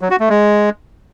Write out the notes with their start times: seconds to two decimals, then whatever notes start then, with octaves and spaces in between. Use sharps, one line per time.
0.01 F#3
0.11 F#4
0.20 A3
0.29 G#3